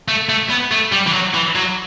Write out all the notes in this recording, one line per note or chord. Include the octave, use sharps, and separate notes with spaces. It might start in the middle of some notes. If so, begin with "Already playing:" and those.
A3
A3
B3
A3
G3
E3
F#3
E3
F#3